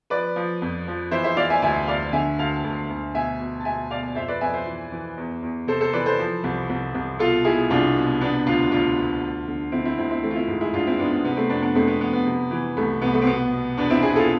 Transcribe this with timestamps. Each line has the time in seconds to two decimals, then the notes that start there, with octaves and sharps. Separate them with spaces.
0.10 F3 B4 D5
0.36 F3
0.62 F2
0.87 F3
1.11 E3 C5 E5
1.24 C5 E5
1.37 E3 D5 F5
1.50 E5 G#5
1.62 D2 E5 G#5
1.87 D2 D5 F5
2.13 D3 E5 G#5
2.38 D2 F5 A5
2.64 D2
2.90 D2
3.14 B2 E5 G#5
3.40 B2
3.60 A5
3.65 B2 E5 G#5
3.90 B2 D5 F5
4.15 F2 C5 E5
4.28 B4 D5
4.41 F2 E5 G#5
4.53 C5 E5
4.66 E3
4.92 E3
5.17 E2
5.42 E2
5.67 C3 A4 C5
5.81 A4 C5
5.93 E3 B4 D5
6.06 A4 C5
6.18 F3
6.44 C2
6.70 C2
6.95 C2
7.19 B2 F4 A4
7.44 B2 E4 G#4
7.70 C2 D4 F4
7.95 B2
8.21 C3 B3 D4
8.46 D2 D4 F4
8.71 D2 D4 F4
8.97 D2
9.22 D2
9.48 D3
9.72 D3 C4 E4
9.85 C4 E4
9.98 D2 C4 E4
10.10 C4 E4
10.23 E3 A3 C4
10.31 F4
10.36 C4 E4
10.48 G#2
10.61 E4 G#4
10.74 G#2 D4 F4
10.87 C4 E4
10.99 G#2 B3 D4
11.12 B3
11.24 C3 B3
11.37 A3 C4
11.50 F2 B3 D4
11.62 B3 D4
11.75 F2 A3 C4
11.87 B3
12.00 F2 B3
12.13 B3
12.26 C3
12.51 E3
12.77 C2 A3
13.02 C2 B3
13.14 A3
13.22 C4
13.27 B2 B3
13.52 B2
13.77 E2 B3 D4
13.90 C4 E4
14.02 B2 E4 G#4
14.16 F4 A4